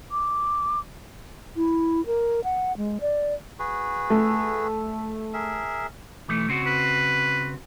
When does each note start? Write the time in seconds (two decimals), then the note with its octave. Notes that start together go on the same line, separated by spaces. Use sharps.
0.11 D6
1.57 E4
2.06 A#4
2.44 F#5
2.77 G#3
3.01 D5
3.59 F#4 G#4 B4
4.10 A3
5.34 G#4 A#4 E5
6.28 B1 E3 A3
6.49 C#3 C4 F#4
6.66 B4